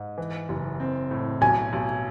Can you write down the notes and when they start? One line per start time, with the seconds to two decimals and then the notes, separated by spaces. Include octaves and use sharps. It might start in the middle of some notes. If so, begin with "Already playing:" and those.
Already playing: G#2
0.18 E3
0.49 F#1
0.80 C4
1.11 A2
1.41 B1 G#5
1.73 B1